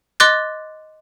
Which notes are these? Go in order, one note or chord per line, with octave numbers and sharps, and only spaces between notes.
D#5 C6 D6 F#6 A6